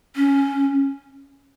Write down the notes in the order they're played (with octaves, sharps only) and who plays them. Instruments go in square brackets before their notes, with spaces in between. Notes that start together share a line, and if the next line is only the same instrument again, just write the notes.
[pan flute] C#4